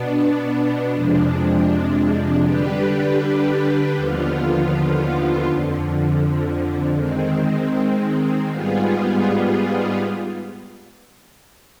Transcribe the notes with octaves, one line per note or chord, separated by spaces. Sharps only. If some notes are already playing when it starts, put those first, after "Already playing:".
Already playing: B2 B3 D4
F2 C3 F3 G#3 D4
D3 G3 D4 G4 B4
D#2 D3 F3 B3 F4
F2 D3 F3
D#3 G#3 C4
G#2 G3 B3 F4 G#4